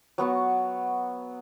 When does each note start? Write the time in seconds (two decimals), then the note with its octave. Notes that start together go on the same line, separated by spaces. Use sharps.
0.18 F#3 B3 F#5 C#6